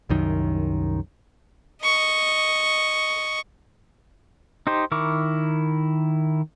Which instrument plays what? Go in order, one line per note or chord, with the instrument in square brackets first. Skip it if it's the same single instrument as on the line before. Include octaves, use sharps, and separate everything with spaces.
[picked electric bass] C2 F#2 D#3
[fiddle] D#5 C#6
[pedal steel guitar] D#4 G4 C5
D#3 E4 A#4 C#6 D6